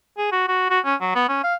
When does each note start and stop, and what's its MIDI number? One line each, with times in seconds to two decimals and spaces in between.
0.18 0.27 68
0.32 0.44 66
0.48 0.68 66
0.70 0.79 66
0.85 0.95 61
1.01 1.12 54
1.15 1.24 59
1.28 1.42 61
1.44 1.55 77